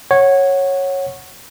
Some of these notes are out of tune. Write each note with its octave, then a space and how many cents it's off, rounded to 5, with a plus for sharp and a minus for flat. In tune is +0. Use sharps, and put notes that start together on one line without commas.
C#5 -10 F#5 +0